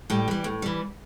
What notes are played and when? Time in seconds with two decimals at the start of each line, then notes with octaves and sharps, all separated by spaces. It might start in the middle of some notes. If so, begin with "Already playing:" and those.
0.10 A2 G3
0.28 E3 G3
0.44 A2
0.62 E3 G3